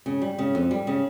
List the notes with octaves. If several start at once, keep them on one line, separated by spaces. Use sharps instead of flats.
C#3
G3
C#3
F2
G3
C#3